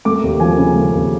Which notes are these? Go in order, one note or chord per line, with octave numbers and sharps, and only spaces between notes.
A3 D6
D#2
F3 G#5
C#3
A3
D#2